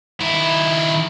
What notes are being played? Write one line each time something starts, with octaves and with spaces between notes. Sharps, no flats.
D#3 E4